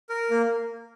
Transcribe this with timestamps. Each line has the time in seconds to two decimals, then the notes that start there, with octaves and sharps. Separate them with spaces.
0.09 A#4
0.30 A#3